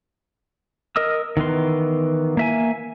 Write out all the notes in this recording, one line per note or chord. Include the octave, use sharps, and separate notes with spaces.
A#4 D#5 D#6 E6
D#3 E3 B3 C6
A#3 E5 G#5